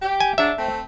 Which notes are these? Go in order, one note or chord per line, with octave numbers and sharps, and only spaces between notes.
G4
G#5
F#3 G#3 D4 E5
A3 C4